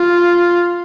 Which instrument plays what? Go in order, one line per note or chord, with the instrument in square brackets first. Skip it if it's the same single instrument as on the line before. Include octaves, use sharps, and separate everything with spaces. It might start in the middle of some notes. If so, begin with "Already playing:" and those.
Already playing: [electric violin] F4